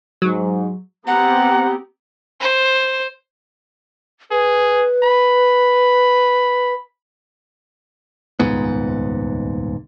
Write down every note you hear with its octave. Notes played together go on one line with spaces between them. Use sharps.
G#2 F#3
B3 C4 G4 F#5 A#5
C5
G#4 B4
B5
D#1 C#2 G#2 B3